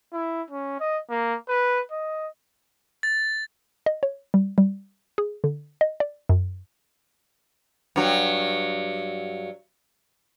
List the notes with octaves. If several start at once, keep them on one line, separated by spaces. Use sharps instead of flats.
E4
C#4
D#5
A#3
B4
D#5
A6
D#5
C#5
G3
G3
G#4
D3
D#5
D5
F#2
G2 F#3